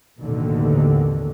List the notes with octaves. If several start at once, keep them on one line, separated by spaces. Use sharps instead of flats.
A1 D#2 B2 D3 D#3